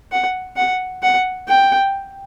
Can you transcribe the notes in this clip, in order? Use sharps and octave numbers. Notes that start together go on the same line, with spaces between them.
F#5
F#5
F#5
G5